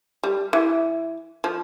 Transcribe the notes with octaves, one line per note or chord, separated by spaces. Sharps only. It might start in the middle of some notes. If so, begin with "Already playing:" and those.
G3
E3
F3